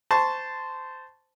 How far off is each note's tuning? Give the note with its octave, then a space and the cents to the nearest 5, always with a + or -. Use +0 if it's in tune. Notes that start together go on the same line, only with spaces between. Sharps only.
C5 -15 A5 +0 C#6 +0